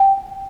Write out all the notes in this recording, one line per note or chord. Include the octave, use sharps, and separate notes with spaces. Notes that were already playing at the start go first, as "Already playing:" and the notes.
Already playing: G5